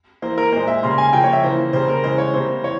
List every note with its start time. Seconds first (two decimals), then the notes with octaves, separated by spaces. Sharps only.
0.22 E3 A#3 C5
0.38 A#4
0.52 A#2 G#3 C5
0.67 E5
0.83 C#3 G3 A#3 C6
0.98 G#5
1.13 C#3 F3 A#3 G5
1.24 C#5
1.33 E5
1.43 C#3 E3 A#3 C5
1.73 C#3 G3 A#3 C5
1.88 A#4
2.04 C#3 E3 G#3 C5
2.18 C#5
2.34 C3 G3 A#3 C5
2.63 E3 C#5